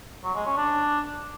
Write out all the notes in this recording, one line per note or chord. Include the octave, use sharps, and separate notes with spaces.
F#3
G#3
C#4
D4